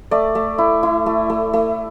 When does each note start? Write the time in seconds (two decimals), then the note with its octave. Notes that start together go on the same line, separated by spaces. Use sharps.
0.11 A3 D5
0.35 A3
0.58 E4
0.83 E4
1.06 A3
1.30 A3
1.53 A3